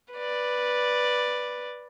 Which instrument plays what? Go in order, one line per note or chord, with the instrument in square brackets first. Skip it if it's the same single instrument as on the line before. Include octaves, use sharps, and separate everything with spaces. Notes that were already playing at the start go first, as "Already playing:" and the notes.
[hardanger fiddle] B4 D5